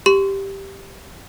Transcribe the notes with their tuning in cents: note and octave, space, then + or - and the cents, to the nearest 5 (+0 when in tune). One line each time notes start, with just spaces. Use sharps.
G4 +0 C6 -20